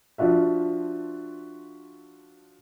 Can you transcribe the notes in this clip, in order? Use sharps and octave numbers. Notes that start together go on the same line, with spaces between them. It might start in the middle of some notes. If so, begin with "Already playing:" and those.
F3 D4 F4 F#4 E5